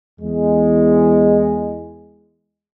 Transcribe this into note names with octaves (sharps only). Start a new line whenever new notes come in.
E2 G#3